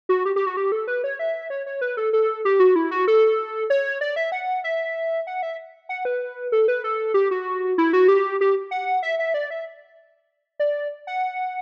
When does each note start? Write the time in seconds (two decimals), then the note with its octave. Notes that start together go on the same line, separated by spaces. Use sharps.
0.09 F#4
0.25 G4
0.36 G4
0.46 F#4
0.57 G4
0.72 A4
0.87 B4
1.04 C#5
1.19 E5
1.50 C#5
1.66 C#5
1.81 B4
1.97 A4
2.13 A4
2.45 G4
2.60 F#4
2.76 E4
2.91 F#4
3.08 A4
3.70 C#5
4.01 D5
4.16 E5
4.32 F#5
4.64 E5
5.27 F#5
5.43 E5
5.89 F#5
6.05 B4
6.52 A4
6.68 B4
6.84 A4
7.14 G4
7.31 F#4
7.78 E4
7.93 F#4
8.08 G4
8.41 G4
8.71 F#5
9.03 E5
9.19 E5
9.34 D5
9.50 E5
10.60 D5
11.07 F#5